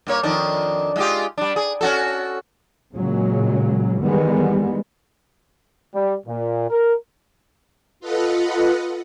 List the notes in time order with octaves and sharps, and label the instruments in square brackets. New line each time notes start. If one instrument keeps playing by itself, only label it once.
[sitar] G2 A#3 C#5
F2 D#3 D4
G#3 F4 G4
G3 D4
G#4
C#4 F#4 A4
[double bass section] A#2 C#3 F#3 G#3
D#3 E3 G3 G#3 B3
[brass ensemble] G3
A#2
A#4
[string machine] F4 A4 B4 D#5 F#5